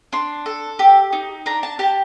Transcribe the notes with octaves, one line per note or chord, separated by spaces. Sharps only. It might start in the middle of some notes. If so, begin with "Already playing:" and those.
D4 C6
A4
G4
D#4
D4 A#5
A5
G4 A5